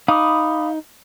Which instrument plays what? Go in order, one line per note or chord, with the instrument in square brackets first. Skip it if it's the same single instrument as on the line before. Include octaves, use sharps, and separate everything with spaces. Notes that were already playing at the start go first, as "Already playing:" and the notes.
[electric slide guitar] D#4 [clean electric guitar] F5 [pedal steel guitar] B5 D6 D#6